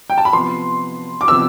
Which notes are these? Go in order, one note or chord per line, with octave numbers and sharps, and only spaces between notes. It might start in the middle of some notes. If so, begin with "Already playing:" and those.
G5
A5
B5
C3 F3 B3 C6
D6
C3 F3 B3 E6